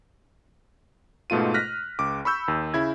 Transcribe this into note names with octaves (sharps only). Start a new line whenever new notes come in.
G#2 B2 A3 F4 D#7
F6 F#6 A#6 B6
C#2 D6
B5 C#6 E6 G6
D#2
C#3 E4 G#6